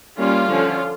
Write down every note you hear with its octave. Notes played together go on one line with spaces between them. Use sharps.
G3 A#3 C#4 F4
D3 F3 C#4